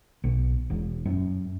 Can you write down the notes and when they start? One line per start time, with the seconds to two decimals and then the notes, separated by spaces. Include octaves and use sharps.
0.24 B1
0.70 E1
1.06 F#2